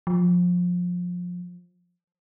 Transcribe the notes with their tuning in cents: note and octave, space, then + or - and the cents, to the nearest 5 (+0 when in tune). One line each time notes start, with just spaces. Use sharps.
F3 +25